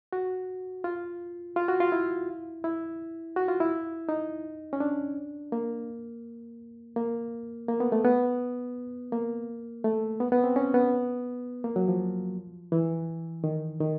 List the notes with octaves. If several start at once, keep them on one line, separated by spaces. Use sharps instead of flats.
F#4
F4
F4
F#4
F4
E4
E4
F#4
F4
E4
D#4
C#4
D4
A#3
A#3
A#3
B3
A3
B3
A#3
A3
B3
B3
C4
C#4
B3
A#3
F#3
F3
E3
D#3
D#3